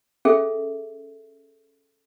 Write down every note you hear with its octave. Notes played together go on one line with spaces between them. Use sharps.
C#4 G#4 A4 E5